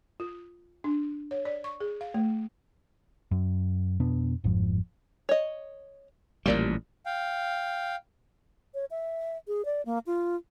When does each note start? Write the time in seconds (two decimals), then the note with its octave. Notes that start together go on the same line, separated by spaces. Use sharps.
0.20 F4
0.84 D4
1.31 C#5
1.45 D5
1.64 C#6
1.80 G#4
2.01 F5
2.14 A3
3.31 F#2
4.00 F2 B2 B3 D4
4.44 G1 F2 G#2 F3
5.29 C#5 D#5
6.46 A1 A#2 F3 G3 A#3 D5
7.06 F5 G5
8.74 C#5
8.91 E5
9.47 G#4
9.65 D5
9.85 A#3
10.06 F4